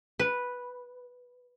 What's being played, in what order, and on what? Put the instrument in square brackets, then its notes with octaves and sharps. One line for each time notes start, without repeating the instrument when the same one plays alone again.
[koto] B4